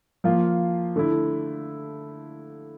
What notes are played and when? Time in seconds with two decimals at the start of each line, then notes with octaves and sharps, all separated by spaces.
0.24 F3 A#3 F4
0.96 D3 A3 E4